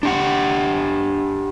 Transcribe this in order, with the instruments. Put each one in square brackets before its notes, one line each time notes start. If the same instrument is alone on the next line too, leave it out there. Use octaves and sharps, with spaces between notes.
[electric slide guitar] D4 G4 F#5